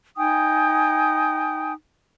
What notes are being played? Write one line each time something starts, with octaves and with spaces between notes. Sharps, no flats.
D#4 G5 G#5 D#6